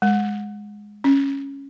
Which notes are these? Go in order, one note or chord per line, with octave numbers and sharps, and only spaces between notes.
G#3
C#4